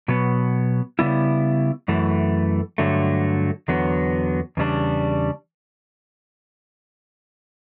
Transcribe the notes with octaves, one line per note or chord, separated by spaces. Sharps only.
B2 F#3 B3
C#3 G3 B3 E4
F#2 E3 A3
G2 D3 F#3 A3
E2 D3 F#3 B3
E2 C#3 G3 D4